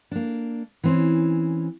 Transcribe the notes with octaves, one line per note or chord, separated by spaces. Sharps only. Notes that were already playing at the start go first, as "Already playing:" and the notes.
A#3 D4
E3 C4 C#4